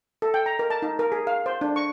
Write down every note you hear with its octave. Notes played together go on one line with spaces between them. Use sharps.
A4
G5
A#5
A#4
A5
D#4
A#4
G#4
F5
C5
D4
C#6